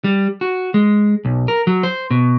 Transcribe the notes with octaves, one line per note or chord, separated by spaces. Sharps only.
G3
F#4
G#3
B1
A#4
F#3
C5
B2